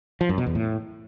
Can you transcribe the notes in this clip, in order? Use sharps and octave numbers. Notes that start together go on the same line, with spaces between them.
F3
F#2
B2
E2
A2